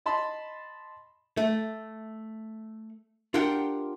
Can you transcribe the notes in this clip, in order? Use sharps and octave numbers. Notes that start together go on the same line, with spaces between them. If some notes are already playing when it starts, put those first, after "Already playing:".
D#5 A5 B5 C6
A3
D4 F4 G4 A#4 F#5 G5